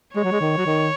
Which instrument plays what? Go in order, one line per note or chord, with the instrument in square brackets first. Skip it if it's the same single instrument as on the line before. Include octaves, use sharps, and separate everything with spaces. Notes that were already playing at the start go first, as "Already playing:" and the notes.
[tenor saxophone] G#3 [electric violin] C#5
[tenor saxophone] F#3
G#3
D#3
F#3
D#3